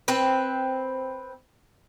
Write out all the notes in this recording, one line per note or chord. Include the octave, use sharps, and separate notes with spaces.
C4 B4